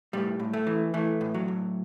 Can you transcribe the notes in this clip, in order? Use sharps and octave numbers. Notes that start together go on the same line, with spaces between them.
A2 G3
A2
A3
E3
E3 A3
A2
F#3
A2